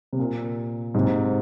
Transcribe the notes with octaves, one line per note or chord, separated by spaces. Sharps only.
C3
A#2
G#2 C3